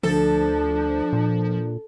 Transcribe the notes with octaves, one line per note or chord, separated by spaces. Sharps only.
D2 F3 D4 A4
A#2